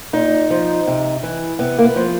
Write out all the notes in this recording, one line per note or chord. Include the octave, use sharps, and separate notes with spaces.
A#2 D#4
F3
C3
E3
C3 B3
A#3
B3
F3